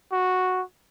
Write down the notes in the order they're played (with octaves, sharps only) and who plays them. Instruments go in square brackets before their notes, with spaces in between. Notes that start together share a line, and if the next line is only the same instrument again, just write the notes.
[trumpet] F#4